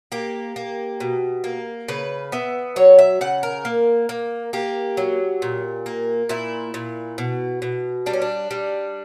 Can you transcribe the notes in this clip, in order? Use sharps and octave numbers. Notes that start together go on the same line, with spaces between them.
A#3 G4
A#3
B2
A#3
C#3 B4
B3 E5
F#3 C#5
E5
C#3 F#5
A#4
A#3
A#3
A#3 G4
F#3
A#2
A#3
A#2 E4
A#2
B2
B2
G3 D4
C#4
D4
G3